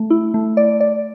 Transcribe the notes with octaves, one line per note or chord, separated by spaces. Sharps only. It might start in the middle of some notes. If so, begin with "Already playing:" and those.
Already playing: A3
E4
A3
D5
D5